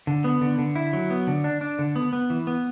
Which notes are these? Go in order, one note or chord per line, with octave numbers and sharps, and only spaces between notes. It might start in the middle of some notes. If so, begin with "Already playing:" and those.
D3
B3
D3
D3
E4
F#3
B3
D3
D4
D4
D3
B3
B3
E3
B3